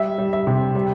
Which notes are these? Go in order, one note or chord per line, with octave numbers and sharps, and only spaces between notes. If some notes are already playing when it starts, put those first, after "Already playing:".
Already playing: G3 E5
G3
E5
C3
G3